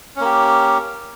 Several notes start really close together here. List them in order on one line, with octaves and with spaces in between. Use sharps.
C#4 A#3 G4